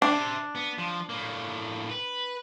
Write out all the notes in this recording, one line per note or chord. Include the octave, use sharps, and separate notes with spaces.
D4 C5 E5
B3
F3
A2 A#3
B4